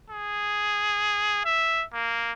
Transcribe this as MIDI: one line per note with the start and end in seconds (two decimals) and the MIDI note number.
0.10 1.44 68
1.45 1.84 76
1.93 2.32 58